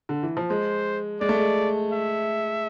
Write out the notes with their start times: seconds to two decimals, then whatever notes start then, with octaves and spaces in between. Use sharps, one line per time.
0.09 D3
0.23 E3
0.37 F3
0.50 G#3 C5
1.21 G#3 D5
1.29 A3
1.37 G#3
1.92 E5